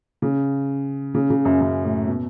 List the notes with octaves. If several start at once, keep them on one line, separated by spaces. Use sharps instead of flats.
C#3
C#3
C#3
F#2
F#2
A2
B2